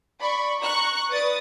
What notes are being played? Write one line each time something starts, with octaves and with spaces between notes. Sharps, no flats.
D5 B5 C#6
A#5 C#6 F#6
B4 D5 D#6 A6